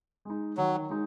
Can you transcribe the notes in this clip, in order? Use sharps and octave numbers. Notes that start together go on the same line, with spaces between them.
G#3 D#4
D#3 F#3
G#3 D#4